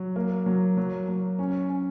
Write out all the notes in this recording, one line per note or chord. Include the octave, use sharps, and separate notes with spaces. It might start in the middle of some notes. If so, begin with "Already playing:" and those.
Already playing: F#3
A#3
F#3
F#3
F#3
C#4
C#4